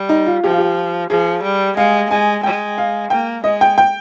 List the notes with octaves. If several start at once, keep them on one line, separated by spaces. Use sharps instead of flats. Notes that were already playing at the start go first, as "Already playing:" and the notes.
Already playing: G3
D#4
F4
F3 G4
F4
G4
F3 G#4
G3
G#3 F5
G#3 G#5
G#3 G5
F5
A#3 G5
G#3 D#5
G5
G5